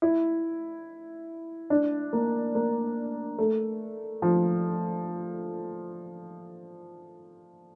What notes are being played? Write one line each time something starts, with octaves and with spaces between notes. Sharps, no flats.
E4
D4
A#3
A#3
A3
F3